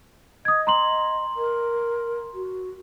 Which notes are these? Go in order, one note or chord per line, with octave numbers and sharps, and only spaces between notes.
D#5 D#6 G#6
A#5 C6 F#7
A#4
F#4